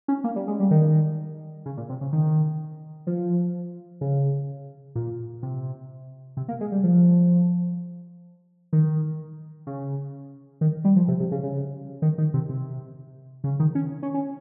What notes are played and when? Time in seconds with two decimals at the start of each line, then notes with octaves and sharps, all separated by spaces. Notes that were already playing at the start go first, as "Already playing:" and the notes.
0.08 C#4
0.24 A#3
0.36 G3
0.48 G#3
0.60 G3
0.71 D#3
1.66 C#3
1.77 A#2
1.89 C3
2.01 C#3
2.13 D#3
3.07 F3
4.01 C#3
4.95 A#2
5.43 C3
6.37 C3
6.49 A#3
6.61 G#3
6.72 G3
6.84 F3
8.73 D#3
9.67 C#3
10.61 D#3
10.85 G3
10.96 F3
11.08 C3
11.20 C3
11.31 C#3
11.43 C#3
12.02 D#3
12.18 D#3
12.34 C3
12.49 C3
13.44 C#3
13.60 D#3
13.75 C#4
14.03 C#4
14.14 C#4